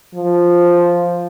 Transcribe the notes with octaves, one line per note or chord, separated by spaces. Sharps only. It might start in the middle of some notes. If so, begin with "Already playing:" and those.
F3